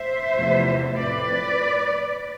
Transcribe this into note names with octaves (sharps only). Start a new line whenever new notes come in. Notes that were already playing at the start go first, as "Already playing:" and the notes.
Already playing: C5 E5
E2 C3 F3 A3
A2 F3 C4 B4 D5